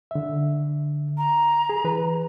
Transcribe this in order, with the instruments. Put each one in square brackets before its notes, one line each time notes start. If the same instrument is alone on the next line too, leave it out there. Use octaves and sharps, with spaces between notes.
[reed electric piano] D3 E5
[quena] A#5
[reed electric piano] G#4
E3 B4